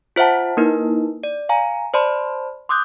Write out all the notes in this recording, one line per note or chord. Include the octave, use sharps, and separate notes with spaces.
F4 C5 E5 F#5 A5
A#3 D#4 E4 A#4 B4
D5
F5 G#5 A#5
C5 D5 A5 B5 C6
C6 D6 D#6 F#6 G6